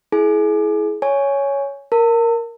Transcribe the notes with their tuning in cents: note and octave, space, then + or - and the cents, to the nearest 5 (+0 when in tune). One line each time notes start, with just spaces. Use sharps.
E4 +0 G#4 +30 G#5 +30
C#5 +5 G#5 +0
A#4 +0 A5 +45